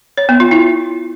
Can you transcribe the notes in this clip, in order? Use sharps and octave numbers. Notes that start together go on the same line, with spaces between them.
C#5
B3
F4
E4